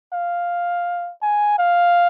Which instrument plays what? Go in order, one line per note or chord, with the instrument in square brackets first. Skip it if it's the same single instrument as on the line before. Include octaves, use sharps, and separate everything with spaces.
[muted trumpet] F5
G#5
F5